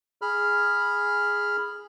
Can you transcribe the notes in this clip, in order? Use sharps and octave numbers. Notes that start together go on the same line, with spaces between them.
G#4 B5 F6